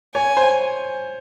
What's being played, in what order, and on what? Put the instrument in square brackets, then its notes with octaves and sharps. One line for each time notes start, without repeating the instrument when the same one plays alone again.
[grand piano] C#5 [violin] G#5
[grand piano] C5